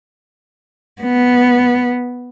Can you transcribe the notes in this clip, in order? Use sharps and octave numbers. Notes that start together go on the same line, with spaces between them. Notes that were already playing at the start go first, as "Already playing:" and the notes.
B3